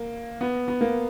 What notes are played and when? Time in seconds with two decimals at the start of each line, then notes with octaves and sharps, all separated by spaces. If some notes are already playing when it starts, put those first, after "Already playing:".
Already playing: A#3
0.41 B3
0.68 B3
0.81 A#3